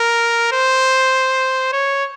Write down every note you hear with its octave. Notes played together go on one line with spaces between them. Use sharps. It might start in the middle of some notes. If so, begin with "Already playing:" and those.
Already playing: A#4
C5
C#5